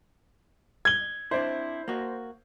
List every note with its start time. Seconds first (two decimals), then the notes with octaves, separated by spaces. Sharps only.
0.85 G#6 G7
1.31 C4 D4 E4 C5
1.88 A#3 F#4